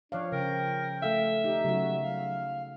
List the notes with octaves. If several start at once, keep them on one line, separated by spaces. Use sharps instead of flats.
F3 D4 C#5 F5
C#3 A#4 G5
A3 A4 E5 F5
D#4 G4
C#3 F#3 F#4
F5